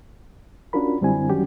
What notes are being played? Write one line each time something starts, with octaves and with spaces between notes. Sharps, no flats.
C#4 D4 F4 F#4 A#4 B5
F#2 D3 G3 C4 E4 G#5
D#3 F#3 G3 C#4 F#4 G4